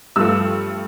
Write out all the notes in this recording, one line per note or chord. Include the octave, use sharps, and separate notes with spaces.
G2 F3 A3 E6